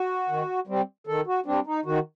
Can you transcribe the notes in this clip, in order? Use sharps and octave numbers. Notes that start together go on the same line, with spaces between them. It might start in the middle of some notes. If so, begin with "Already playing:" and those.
Already playing: F#4
D#3
G3 C4
D#3 A4
F#4
G3 C4 D4
D#4
D#3 F#4